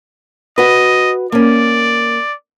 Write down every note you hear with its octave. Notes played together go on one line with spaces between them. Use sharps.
F#4 B4 D#5
A#3 C#4 D5